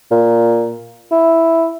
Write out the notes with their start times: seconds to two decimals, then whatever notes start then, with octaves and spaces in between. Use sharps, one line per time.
0.11 A#2
1.12 E4